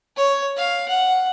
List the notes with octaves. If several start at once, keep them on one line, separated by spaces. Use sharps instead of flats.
C#5
F5
F#5